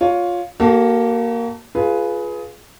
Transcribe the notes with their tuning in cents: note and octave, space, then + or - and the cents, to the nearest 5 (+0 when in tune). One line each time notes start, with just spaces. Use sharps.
F4 +15 C#5 +15
A#3 +0 F#4 +45 A4 +0
F4 +0 G#4 +20 B4 -5